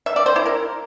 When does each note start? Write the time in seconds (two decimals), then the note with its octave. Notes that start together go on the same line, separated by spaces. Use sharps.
0.06 E5
0.16 D5
0.26 C5
0.36 E4
0.46 A#4